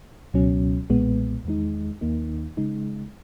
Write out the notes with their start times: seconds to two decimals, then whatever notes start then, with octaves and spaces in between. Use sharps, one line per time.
0.34 C#2 B2 F#3 C#4
0.90 B1 A#2 G#3 B3
1.45 E2 D#3 G#3 D#4
2.01 D#2 D#3 A#3 D#4
2.57 C#3 G#3 D#4